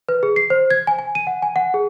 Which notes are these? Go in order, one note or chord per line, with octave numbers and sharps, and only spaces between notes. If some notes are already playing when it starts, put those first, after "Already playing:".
B4
G#4
C7
C5
G#6
G#5
G#5
D#7
F#5
G#5
F#5
G#4